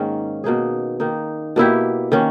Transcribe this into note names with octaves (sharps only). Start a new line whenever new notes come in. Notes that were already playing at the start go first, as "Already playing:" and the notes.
Already playing: G#2 D#3 A#3 C#4
B2 A#3 D#4 G#4
D#3 A#3 D#4
B2 A#3 E4 G4
D#3 A#3 C#4